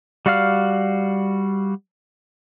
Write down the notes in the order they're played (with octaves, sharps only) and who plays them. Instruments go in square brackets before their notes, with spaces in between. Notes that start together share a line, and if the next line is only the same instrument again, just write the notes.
[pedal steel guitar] G3 F#4 D5 F5 F6